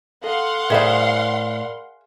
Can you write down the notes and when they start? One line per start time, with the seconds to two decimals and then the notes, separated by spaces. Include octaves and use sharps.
0.24 A4 F5 F#5 C6
0.70 A2 G#4 A#4 C5 D5 E5 B5